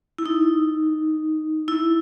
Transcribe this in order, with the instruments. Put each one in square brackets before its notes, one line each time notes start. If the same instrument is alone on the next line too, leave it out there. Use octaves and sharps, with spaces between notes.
[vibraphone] E4
D#4
E4